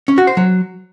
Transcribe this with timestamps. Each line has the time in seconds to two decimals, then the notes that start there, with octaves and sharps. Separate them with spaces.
0.08 C#4
0.18 F#4
0.27 C5
0.37 F#3